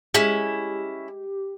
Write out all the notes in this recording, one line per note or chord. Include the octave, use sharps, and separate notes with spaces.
G#3 C#4 E4 G4